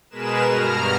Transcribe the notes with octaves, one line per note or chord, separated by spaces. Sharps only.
B2 G#3 G#4 A#4 B4 E7
G2 B2 A#5 F6